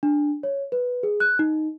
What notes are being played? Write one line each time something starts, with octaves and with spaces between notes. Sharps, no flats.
D4
C#5
B4
G#4
F#6
D#4